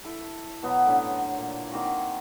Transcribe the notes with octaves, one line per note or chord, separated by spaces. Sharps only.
E4 A4
B2 F#3 B3
A2 D3 C#4
C5
A#2
D#3 A#3 C4 F#4